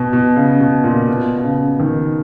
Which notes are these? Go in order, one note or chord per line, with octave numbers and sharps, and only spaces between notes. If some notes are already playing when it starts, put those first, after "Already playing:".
Already playing: B2
B2
C#3
B2
A#2
B2
B2
C#3
D#3